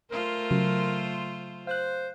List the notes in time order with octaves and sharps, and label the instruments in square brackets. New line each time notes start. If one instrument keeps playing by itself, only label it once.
[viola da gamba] A3 F4 C5 [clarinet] A#4
[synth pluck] C#3 F#3
[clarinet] C5 [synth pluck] F5 F#6